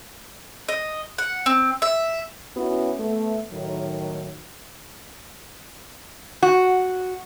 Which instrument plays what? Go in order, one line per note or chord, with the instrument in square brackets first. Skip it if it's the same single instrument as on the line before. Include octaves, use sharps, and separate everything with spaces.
[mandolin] D#5
F#5
C4
E5
[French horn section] B3 C#4 E4 F#4
A3 B3
A2 D#3 F#3
[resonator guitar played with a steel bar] F#4